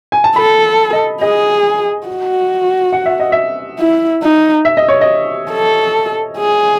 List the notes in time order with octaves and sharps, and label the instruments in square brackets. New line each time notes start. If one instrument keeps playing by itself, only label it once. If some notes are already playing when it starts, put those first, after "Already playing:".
[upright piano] G#5
A5
[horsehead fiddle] A4 [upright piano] B5
[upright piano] D#5
[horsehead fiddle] G#4 [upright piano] D#5
[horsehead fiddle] F#4
[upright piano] F#5
E5
D#5
E5
[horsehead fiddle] E4
D#4
[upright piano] E5
D#5
C#5
D#5
[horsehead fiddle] A4
G#4